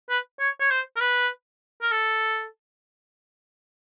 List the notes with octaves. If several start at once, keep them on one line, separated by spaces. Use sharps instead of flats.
B4
C#5
C#5
C5
A#4
B4
A#4
A4